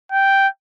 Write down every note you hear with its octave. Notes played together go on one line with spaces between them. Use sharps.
G5